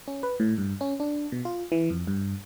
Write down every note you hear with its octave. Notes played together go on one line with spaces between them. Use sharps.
C#4
B4
A2
G2
C#4
D4
B2
F4
E3
F2
G2